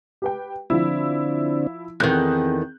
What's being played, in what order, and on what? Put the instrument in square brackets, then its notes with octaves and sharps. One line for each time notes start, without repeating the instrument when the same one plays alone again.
[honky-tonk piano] G4 B4 G5
[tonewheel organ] D3 C4 D4 [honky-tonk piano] F3 E4
[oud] E2 D#3 [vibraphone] C4 G#4 G5 [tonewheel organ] A4 [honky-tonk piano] F#6 G6